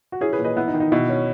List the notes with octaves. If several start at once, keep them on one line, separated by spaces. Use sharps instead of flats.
F#4
C#4 E4 G#4
G#4 B4
A#2
B4 D#5
B3 E4
D#4
D#3
D#4
B2 E4
C#4